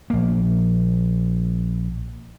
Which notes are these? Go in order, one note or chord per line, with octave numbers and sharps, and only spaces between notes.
A#1 A#3